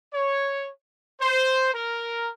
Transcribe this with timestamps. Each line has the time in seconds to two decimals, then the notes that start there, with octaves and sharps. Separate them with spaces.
0.13 C#5
1.21 C5
1.74 A#4